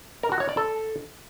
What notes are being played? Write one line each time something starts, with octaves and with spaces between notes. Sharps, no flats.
A#4
F#4
C#5
D5
A4